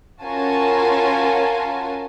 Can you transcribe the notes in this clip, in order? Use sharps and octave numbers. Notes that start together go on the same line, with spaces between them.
C#4 F4 F#4 A#4 G#5 A5